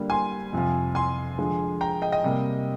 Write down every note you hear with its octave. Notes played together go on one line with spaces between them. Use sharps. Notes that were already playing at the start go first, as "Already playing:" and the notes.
Already playing: D3 G3 A#3 D4
G#5 C6
F2 C3 F3
G#5 C6
D3 F3 G#3
G5 A#5
D#5 G5
D#5 G5
C3 G3 A#3